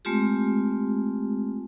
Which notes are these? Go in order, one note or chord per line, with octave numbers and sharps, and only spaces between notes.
G#3 A3 C4 F4 G4